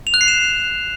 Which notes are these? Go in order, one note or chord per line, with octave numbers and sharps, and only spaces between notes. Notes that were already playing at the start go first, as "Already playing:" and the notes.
F7
F#6
C7
E7